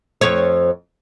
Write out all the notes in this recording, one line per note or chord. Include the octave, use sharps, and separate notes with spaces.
F2 C#5